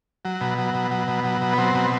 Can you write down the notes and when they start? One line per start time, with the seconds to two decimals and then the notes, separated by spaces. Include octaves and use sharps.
0.25 F#3
0.41 B2
0.58 F#3
0.74 B2
0.91 F#3
1.08 B2
1.24 F#3
1.41 B2
1.53 B3
1.58 F#3 C4
1.74 B2